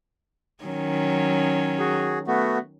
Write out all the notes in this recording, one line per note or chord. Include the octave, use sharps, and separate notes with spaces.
D#3 F#3 C#4
F#4 G#4
A3 B3 F#4